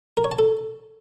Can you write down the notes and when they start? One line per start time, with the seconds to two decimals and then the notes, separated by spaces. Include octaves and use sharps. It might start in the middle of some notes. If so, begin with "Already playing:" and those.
0.17 A#4
0.24 C#5
0.32 A5
0.39 A4